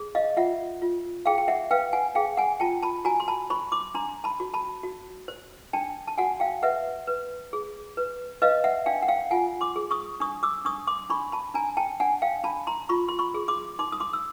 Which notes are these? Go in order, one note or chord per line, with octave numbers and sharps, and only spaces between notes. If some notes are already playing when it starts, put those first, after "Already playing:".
Already playing: G#4
D#5 F5
F4 E5 F#5
F4
G#4 F5 G5
G5
E5 F#5
B4 F5 G5
F#5 G#5
G#4 F5 G5
F#5 G#5
F4 G5 A5
A5 B5
F#4 G#5 A#5
C6
A5 B5
C5 B5 C#6
C6 D6
D4 A#5 C6
A5 B5
F#4
A5 B5
F#4
C5
D4 G5 A5
A5
F#4 F#5 G#5
F5 G5
B4 E5 F#5
B4
G#4
B4
B4 D#5 F5
E5 F#5
D4 F5 G5
F#5
F5 G5
F4 F#5 G#5
C6 D6
G#4
C#6 D#6
D4 C#6 D#6
D6 E6
D4 C#6 D#6
C6 D6
D4 B5 C#6
A5 B5
D4 G#5 A#5
G5 A5
D4 F#5 G#5
F5 G5
D4 A5 B5
A#5 C6
F4 B5 C#6
C6
B5 C#6
G#4
C6 D6
D#4 C6 D6
D#6
C6 D6
E6